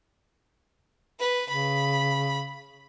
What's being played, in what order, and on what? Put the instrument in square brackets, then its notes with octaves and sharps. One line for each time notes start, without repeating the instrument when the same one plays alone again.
[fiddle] B4
[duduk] C#3 [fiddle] B5